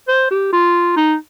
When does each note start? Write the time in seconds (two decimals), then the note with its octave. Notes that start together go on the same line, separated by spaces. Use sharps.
0.08 C5
0.31 G4
0.53 F4
0.97 D#4